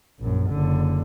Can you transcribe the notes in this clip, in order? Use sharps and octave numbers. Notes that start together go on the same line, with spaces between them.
A#1 F#2
F#1 D3